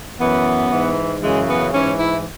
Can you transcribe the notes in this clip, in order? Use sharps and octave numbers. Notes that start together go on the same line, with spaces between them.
F#2 E3 B3
G#2 E3
F#2 C#3 E3 G#3
B3
G#2 E3 C#4
E4